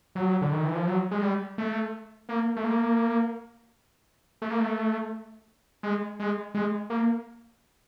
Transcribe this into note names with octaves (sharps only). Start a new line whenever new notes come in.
F#3
D3
D#3
E3
F3
F#3
G#3
G3
A3
A#3
A3
A#3
A3
A#3
A3
G#3
G#3
G#3
A#3